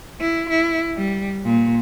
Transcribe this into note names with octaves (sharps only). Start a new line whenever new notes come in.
E4
E4
G3
A#2